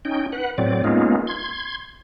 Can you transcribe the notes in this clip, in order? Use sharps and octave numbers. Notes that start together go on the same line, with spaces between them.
C#4 D#4 G5
B4 F#5
A2 F#3 C4 D5
G#3 A#3 B3 C#4 D#4 F4
C6 G#6